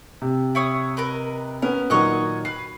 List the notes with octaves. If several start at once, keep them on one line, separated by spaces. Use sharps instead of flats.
C3
E4 C#5 D#6
A#4 B4 D#5
B3 C#4 A#4
A#2 D#3 F#3 C#5 D#5 F#5
B4 C7